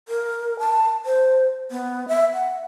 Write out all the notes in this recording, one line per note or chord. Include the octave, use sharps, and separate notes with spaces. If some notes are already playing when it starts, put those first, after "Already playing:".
A#4
A5
C5
B3
E5
F#5